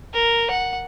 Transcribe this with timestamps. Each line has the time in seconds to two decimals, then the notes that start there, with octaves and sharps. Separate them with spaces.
0.14 A#4
0.50 F#5